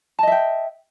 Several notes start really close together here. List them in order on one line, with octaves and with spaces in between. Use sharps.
A5 D#5 E5 G5